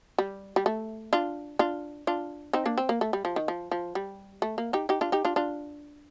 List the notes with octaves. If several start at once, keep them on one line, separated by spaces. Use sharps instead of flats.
G3
G3
A3
D4 F4
D4 F4
D4 F4
C4 D#4
A#3 D4
C4
A#3
A3
G3
F3
D#3
F3
F3
G3
A3
A#3
D#4 G4
D#4 G4
D4 F4
D#4 G4
D4 F4
D4 F4